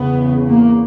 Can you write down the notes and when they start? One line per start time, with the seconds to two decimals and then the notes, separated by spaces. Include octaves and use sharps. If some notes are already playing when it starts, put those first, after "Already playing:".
Already playing: E2 C#3 B3
0.47 A#3